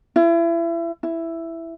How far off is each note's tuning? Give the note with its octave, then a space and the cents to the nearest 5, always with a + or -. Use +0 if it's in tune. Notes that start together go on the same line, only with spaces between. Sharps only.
E4 +30
E4 +5